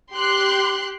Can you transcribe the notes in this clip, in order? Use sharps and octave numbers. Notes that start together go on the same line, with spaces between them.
G4 C6 F#6